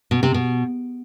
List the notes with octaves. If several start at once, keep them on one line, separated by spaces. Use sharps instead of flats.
B2
C3
B2